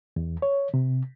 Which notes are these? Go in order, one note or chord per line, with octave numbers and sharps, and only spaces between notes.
E2
C#5
C3